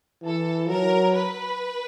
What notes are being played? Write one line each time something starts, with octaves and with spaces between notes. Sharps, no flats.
E3 A4
F#3 A#4
B4